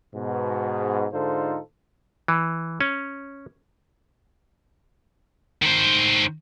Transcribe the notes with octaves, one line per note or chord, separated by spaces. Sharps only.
G#2 B2
G#2 D3 D#4 F4 A4 C5
E3
C#4
D#3 C5